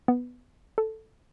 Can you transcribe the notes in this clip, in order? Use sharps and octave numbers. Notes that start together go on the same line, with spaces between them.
B3
A4